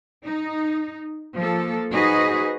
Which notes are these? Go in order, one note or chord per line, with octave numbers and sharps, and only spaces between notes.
D#4
F3 A#3 A4
D#4 F#4 G#4 B4 C5 D#5